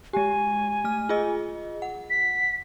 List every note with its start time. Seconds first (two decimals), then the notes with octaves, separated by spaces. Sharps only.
0.13 G#3 G4 G#5
0.84 A3 F6
1.09 F4 G#4 D#5
1.82 F#5
2.10 B6